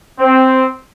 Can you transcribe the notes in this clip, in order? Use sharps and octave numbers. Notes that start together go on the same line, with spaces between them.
C4